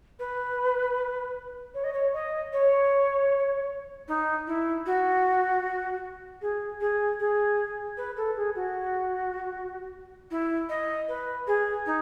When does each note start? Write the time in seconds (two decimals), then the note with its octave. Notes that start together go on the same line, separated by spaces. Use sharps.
0.19 B4
1.74 C#5
1.84 D#5
1.93 C#5
2.13 D#5
2.53 C#5
4.08 D#4
4.47 E4
4.86 F#4
6.41 G#4
6.80 G#4
7.19 G#4
7.97 B4
8.17 A4
8.36 G#4
8.55 F#4
10.30 E4
10.69 D#5
11.08 B4
11.47 G#4
11.86 D#4